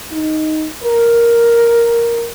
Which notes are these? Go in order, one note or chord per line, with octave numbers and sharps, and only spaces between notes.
D#4
A#4